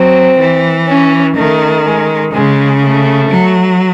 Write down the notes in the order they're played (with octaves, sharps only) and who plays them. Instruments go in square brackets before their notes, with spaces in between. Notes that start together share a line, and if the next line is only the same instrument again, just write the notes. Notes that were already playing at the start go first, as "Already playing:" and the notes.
Already playing: [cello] F#3 [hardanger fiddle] C4
[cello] E3
[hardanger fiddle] C#4
[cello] D#3 [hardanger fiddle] A3
[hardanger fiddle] G#3
[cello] C#3 [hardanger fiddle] G#3
[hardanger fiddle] A3
[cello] F#3